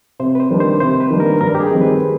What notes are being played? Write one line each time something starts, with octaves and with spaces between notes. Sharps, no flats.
C3 C5
B4
C5
D#3 G3 A#3 D4
C5
C3 C5
B4
D#3 G3 A#3 D4
A#4
G2 A#4
G4
G#4
D#3 G3 C4 D#4
B4